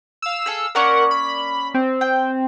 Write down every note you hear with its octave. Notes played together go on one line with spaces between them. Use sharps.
F5 E6
G#4 A4
A#3 C#4 A#4 D5 F#5
B5
C4
G5